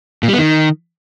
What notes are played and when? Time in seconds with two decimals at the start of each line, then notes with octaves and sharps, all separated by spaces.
0.23 A#2
0.28 G3
0.33 B3
0.38 D#3